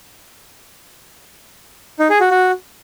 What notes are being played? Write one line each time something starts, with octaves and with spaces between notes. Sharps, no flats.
D#4
G#4
F#4
F#4